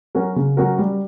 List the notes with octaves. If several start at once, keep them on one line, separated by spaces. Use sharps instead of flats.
F#3 C#4 F#4 A#4
C#3
F#3 C#4 F#4 A#4
G3